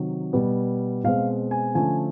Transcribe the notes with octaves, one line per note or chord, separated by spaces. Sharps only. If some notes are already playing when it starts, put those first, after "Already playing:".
Already playing: C3 D#3 F#3
B2 G3 B3
B2 G#3 C4 F5
G#5
D3 F3 A3 C#4 G#5